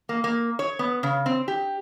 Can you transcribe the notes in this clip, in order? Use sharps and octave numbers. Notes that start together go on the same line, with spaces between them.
A#3
A#3
C#5
B3
C#3
C4
G4